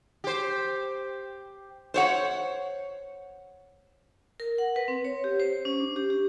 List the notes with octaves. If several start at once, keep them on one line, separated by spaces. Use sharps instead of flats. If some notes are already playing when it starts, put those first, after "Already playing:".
G4 C5
C5 C#5 F#5
A#4
F#5
B4
C4
C#5
G4
C5
C#4
D4
G4
G4